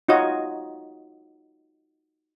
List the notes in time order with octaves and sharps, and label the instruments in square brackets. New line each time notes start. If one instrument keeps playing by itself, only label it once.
[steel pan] D#4 F4 F#4 C#5 D#5